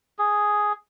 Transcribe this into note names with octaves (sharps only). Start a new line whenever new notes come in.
G#4